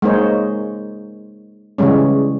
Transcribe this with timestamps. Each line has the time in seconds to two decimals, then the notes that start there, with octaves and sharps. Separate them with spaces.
0.02 G#3 A#3 D#4 C5 C#5
1.78 C#3 E3 G3 G#3 C#4